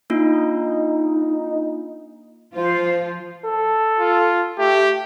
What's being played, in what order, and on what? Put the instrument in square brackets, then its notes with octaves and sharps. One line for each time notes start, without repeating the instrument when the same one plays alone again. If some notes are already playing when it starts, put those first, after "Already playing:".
[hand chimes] A#3 D4 F4 [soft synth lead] D#4
[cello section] F3 F4 [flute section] C5
[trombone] A4
[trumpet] F4
[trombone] A3 [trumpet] G4